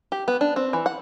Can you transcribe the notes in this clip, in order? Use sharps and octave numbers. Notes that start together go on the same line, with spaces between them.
G4
B3
D4
C4
E3
F#5